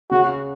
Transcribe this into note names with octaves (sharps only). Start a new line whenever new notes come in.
C#3 F#4